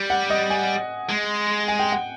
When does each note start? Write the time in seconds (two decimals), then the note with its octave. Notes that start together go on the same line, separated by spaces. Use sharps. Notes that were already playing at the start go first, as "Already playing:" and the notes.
Already playing: G3
0.10 F#5
0.30 D#5
0.50 G#5
1.09 G#3
1.68 G#5
1.79 G5
1.92 F#5